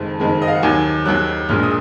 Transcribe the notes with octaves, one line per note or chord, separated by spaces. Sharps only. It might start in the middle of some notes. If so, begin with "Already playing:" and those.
Already playing: F#1 F2 D#3 G#3
F#1 F2 D#3 G#3
D#5
F5
F#5
D#2 D#3 F#3 G#5
D#2 D#3 F#3 F#6
A#1 A#2 G#3 F6
D#6